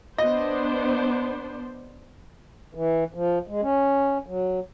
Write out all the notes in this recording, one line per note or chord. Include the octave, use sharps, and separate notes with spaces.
B3 D4 C5 D#5
E3
F3
G#3
C#4
F#3